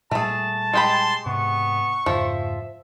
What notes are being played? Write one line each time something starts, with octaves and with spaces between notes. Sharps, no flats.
A#2 G3 A3 G#4 A5
G#3 G4 B5 C6
G#2 C3 B3 C#6
F2 G#2 C#3 F3 E5